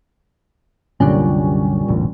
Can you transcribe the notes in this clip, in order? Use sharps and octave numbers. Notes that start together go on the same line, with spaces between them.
C2 F#2 A#2 D3 G3 C#4
E1 A1 D2